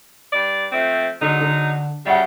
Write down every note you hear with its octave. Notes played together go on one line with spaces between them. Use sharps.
G2 D5
F3 A3 C4
D3 F#3 G#3 D#4
D3
C#3 F#3 G3 E5 F#5